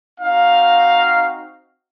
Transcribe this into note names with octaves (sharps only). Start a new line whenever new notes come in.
C4 D#4 F#4 F5